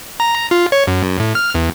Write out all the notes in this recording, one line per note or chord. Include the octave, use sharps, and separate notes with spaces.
A#5
F4
C#5
F#2
A2
F6
E2